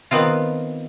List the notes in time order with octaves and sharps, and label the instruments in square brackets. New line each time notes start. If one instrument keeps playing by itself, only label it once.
[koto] D#3 B3 C4 F4